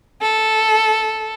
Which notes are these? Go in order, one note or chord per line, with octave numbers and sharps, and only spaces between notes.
A4